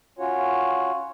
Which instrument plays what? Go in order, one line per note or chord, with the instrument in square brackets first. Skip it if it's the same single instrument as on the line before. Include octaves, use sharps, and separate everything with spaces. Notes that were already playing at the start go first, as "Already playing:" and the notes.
[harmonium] C#4 F4 F#4 C#5